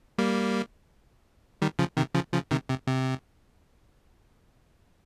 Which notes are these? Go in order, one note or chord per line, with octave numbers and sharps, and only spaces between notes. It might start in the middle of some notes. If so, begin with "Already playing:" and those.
G3 A#3
D#3 G3
C#3 F3
C3 D#3
C#3 F3
C#3 F3
C3 D#3
C3
C3